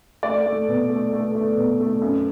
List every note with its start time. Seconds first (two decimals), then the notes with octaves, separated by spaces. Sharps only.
0.23 A3 D5
0.46 A3
0.68 B2
0.90 A3
1.13 A3
1.35 A3
1.57 B2
1.80 A3
2.02 F#2